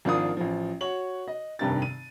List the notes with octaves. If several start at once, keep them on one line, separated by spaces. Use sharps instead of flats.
G#1 F3 D4 F4 A#4 D#6
A1 F3
F#4 C#5 F#7
D#5
F1 G2 C3 D#3 A6
D#7